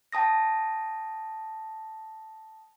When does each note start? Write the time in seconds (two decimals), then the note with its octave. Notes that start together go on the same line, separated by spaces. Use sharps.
0.12 G5 A5 D#6 A#6